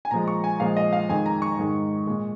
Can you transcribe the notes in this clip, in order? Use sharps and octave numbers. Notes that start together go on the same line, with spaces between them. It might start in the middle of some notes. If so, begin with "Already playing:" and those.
G#5
A#2 F3 G#3 A#5
C#6
G#5
A#2 F3 G#3 F5
D#5
F5
F2 D#3 G#3 G#5
A#5
C#6
G#2 D#3 G#3
A#2 G#3